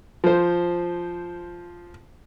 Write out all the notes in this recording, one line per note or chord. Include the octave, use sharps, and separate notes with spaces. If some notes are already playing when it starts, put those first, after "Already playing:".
F3 C5